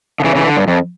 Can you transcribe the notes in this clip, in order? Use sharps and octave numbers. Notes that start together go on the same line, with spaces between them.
D3
C#3 E3
C#3 E3
D3
G2
F2